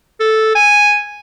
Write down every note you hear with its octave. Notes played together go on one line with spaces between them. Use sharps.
A4
G#5